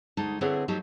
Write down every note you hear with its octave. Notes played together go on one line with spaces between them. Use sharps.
D2 G#3 D#4 A5
D3 C4 E4 G#4 B4 C#5
F3 F#3 A3 D#4 G4 A5